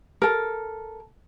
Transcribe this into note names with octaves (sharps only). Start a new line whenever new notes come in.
A4 A#4